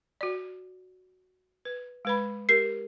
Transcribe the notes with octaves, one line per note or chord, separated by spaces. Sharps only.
F#4 D5
B4
G#3 B4 B5
G4 A#4 C7